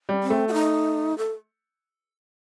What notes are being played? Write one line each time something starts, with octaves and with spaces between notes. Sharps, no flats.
G3
C4
A3
F#4
D#4
A4